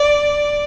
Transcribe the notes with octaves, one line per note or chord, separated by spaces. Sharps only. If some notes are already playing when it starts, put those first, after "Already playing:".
Already playing: D5